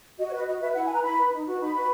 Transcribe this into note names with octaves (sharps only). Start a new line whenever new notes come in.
F#4 D#5
C#5
B4 D#5
F#4 D#5
B4 E5
E4 F#5
G#5
B4 A#5
E4 B5
B4
D#4
F#4 B4
D#4 B5
F#4 B4